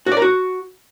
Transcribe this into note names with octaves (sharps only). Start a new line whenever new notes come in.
F#4
D5
A#4
F#4